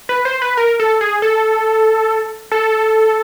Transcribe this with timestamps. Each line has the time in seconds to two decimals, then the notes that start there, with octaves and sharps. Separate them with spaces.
0.09 B4
0.25 C5
0.42 B4
0.57 A#4
0.80 A4
1.01 G#4
1.22 A4
2.52 A4